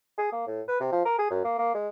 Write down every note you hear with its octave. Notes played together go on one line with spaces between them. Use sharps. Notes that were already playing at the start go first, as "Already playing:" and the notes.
G#4
A#3
A2
B4
C3
F3
A#4
G#4
F#2
A#3
A#3
G#3